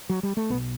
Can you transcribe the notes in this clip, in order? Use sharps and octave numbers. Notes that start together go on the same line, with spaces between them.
F#3
G3
A3
B1 B2 B3